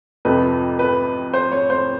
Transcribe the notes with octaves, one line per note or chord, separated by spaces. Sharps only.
F2 C3 F3 B4
B4
C5
C#5
C5